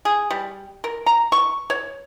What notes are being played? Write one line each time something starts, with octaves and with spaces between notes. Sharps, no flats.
G#4
G3
A#4
A#5
C#6
C#5